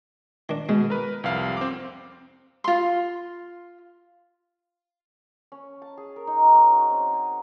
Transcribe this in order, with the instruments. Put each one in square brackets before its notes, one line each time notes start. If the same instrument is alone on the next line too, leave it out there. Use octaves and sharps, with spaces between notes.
[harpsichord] D#3 D4
[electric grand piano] B2 [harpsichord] G#3
[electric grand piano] A#4 B4
C2 F2 F5
C4 D6
[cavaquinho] F4 C6
[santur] C#4
A5
G#4
A#4
D#4
C#4
F#4
C4
G#5